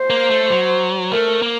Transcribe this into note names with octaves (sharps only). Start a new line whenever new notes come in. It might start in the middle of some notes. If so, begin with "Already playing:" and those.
Already playing: C5
A#3
A3
F#3
A3 A#4
A#3